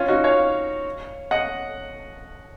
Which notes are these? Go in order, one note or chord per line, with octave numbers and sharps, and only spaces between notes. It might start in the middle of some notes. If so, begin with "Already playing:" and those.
Already playing: C#4 F4
D#4 F#4
C#5 F5
D#5 F#5